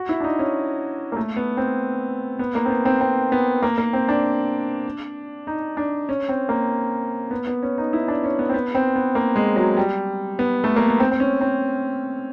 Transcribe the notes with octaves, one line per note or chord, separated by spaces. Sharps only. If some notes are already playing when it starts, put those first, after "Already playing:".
Already playing: F#4
E4
D4
D#4
C#4
A#3
A3
B3
C4
B3
A#3
C4
B3
C4
C4
B3
A#3
A#3
C4
D4
D#4
D4
C#4
C4
A#3
B3
B3
C#4
D#4
E4
D4
C#4
B3
C4
B3
C4
B3
A#3
G#3
F#3
G3
B3
A3
A#3
B3
C4
C4
C#4
C4